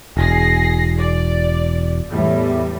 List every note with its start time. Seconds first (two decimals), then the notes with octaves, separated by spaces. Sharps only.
0.17 E1 G#4 A#6 C7
0.97 D5
2.10 E2 A2 G3